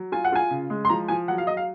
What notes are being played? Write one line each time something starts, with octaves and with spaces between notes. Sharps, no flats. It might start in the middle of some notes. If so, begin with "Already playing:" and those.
Already playing: F#3
F4 G#5
F#5
F4 G#5
C#3
G#3
C6
F3 A#5
F3 G#5
F#3 F#5
F5
F#3 D#5
F5